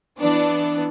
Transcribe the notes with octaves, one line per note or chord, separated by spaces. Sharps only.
E3 B3 D4 D5